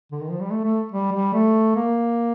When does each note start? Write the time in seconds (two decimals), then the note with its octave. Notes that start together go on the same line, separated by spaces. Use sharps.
0.12 D3
0.21 D#3
0.31 F3
0.41 G3
0.51 A3
0.64 A3
0.92 G3
1.12 G3
1.34 A3
1.75 A#3